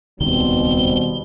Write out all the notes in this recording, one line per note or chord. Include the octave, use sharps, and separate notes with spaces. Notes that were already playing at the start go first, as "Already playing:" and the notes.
D#1 C#2 B2 D#3 G3 C4 G7